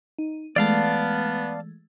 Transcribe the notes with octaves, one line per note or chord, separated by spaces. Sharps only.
D#4
E3 G#3 A3 B3 D5 F5 A5